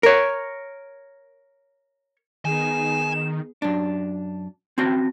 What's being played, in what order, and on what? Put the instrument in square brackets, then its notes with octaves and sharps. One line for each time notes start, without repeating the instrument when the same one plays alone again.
[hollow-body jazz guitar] A#4 C#5
[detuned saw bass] D#3 [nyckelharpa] B3 G#4 [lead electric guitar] G#5 [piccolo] E7
[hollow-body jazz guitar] F#2 D4
C4 C#4 F#4 G5